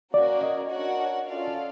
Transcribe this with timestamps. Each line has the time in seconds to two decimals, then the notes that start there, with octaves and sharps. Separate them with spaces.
0.14 A#3 C#4 F#4 A#4 D5
0.43 D#5
0.71 D4 F#4 A#4 C#5 F#5
1.28 C#4 F4 A4 D5 F5